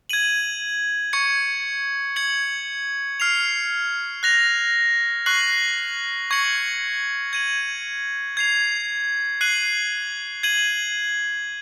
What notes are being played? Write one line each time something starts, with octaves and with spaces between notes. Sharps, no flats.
G#6 D#7 F#7
C#6 G#6 C#7
G#6 C#7 F#7
F6 C7 F7
F#6 A#6 F7
C#6 F#6 C7 F#7
C#6 G#6 C#7 F#7
G#6 D#7 F#7
G#6 C7 F7
F#6 C7 D#7 F#7
G#6 D#7 F#7